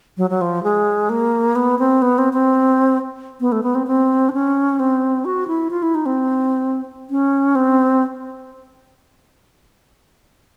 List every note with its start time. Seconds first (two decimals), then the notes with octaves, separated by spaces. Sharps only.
0.17 F#3
0.30 F#3
0.41 F3
0.63 G#3
1.09 A#3
1.56 B3
1.79 C4
2.02 B3
2.18 C4
2.33 C4
3.41 B3
3.52 A3
3.63 B3
3.75 C4
3.87 C4
4.29 D4
4.33 C#4
4.80 C4
5.25 F#4
5.48 E4
5.71 F4
5.83 E4
5.95 D#4
6.06 C4
7.10 C#4
7.55 C4